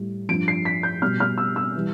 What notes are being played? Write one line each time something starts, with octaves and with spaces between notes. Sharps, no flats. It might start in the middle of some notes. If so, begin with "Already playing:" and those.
Already playing: A2 G3
G2 F3 D7
C7
B6
G6
B2 G3 F6
F6
E6
E6
E3 G3